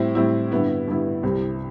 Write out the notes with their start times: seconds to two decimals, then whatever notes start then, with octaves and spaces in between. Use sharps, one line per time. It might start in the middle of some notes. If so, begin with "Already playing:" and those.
Already playing: A2 G3 C4 E4
0.15 A2 G3 C4 E4
0.52 G2 D3 G3 B3 E4
0.87 G2 D3 G3 B3 E4
1.23 C2 C3 G3 C4